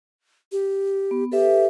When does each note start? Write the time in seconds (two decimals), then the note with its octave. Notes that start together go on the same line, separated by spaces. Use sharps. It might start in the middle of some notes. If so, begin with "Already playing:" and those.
0.52 G4
1.11 B3
1.32 G4 A4 B4 E5